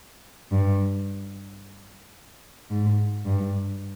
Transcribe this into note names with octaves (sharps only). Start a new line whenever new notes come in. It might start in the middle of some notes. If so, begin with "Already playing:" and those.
G2
G#2
G2